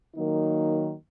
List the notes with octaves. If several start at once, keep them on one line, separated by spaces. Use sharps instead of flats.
D#3 F#3 A#3 D#4